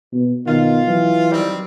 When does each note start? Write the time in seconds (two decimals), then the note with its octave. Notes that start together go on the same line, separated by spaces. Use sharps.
0.13 B2
0.47 B2 D#3 F4
0.87 E3 F#3
1.31 D#3 G3 C4